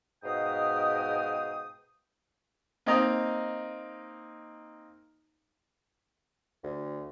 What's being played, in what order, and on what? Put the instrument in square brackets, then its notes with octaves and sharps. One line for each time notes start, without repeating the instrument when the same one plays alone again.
[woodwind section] G#2 B2 F5 G5 D#6
[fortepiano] A#3 C4 D#4 D#5 A#5
[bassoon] D2